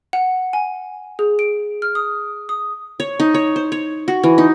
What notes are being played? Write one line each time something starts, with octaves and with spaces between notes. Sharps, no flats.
F#5
G#5
G#4
D7
F6
D#6
D#6
C#5
D#4
C#5
C5
C#5
F#4
E3
D#4